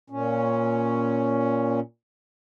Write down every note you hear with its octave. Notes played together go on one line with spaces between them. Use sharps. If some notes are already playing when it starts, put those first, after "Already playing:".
A#2 C#4